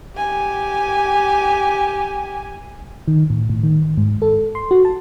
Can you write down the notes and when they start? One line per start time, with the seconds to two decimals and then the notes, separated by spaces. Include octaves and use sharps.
0.17 G4 G#5
3.08 D#3
3.30 A2
3.50 A2
3.63 D#3
3.97 G#2
4.22 A4
4.55 C6
4.71 F#4
4.85 A5